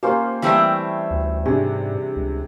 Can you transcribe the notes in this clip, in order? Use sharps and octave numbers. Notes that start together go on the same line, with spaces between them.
A#3 C#4 F4 G4 C5
E3 G3 A3 C4 C#5 E6
D2
G#2 C3 D4 G#4
C#2